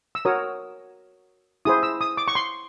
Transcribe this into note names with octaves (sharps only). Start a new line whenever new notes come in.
E6
F#4 A#4 C#5 D#6
E4 G#4 C5 D#6
E6
D#6
D6
C#6
C6